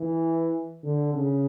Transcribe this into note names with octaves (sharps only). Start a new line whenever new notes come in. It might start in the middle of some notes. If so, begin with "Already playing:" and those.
Already playing: E3
D3
C#3